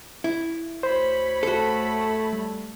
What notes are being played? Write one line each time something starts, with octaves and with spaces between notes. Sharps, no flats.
E4
D2 C5 C#5 B5
A3 F#4 A4
G3